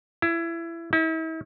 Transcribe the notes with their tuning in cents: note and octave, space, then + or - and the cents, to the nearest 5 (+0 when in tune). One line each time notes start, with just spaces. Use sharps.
E4 +25
E4 -40